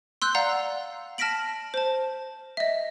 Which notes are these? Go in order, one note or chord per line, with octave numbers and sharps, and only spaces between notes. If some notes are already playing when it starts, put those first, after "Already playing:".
C6 E6 F#6 G6
D5 F5 F#5 A#5
A5 F6 A#6 B6 D7 F#7
C5 A5
D#5 E5